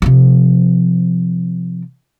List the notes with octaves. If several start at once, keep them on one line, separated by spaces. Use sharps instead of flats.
C3 F3